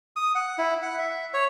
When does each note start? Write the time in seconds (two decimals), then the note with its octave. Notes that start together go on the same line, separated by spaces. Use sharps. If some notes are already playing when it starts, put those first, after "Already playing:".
0.16 D#6
0.35 F#5
0.58 E4
0.82 F#5
0.99 E5
1.34 C#5